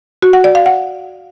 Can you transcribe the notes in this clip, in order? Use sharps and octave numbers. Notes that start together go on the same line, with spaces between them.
F#4
F#5
D5
F5
F#5